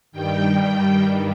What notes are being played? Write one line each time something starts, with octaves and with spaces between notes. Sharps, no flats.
G2 D#3 G3 G5